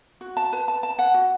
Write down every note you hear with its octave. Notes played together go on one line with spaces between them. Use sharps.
F#4
A5
B4
A5
A5
F#5
F#4